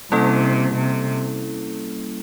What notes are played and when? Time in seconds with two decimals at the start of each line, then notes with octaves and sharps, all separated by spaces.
0.12 C3 G3 A#3 C#4 E4 A4
0.75 C3